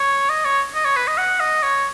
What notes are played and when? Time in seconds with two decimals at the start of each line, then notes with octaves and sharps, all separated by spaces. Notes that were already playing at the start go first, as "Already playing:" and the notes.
Already playing: C#5
0.30 D#5
0.45 C#5
0.74 D#5
0.85 C#5
0.96 B4
1.07 D#5
1.18 F#5
1.40 D#5
1.63 C#5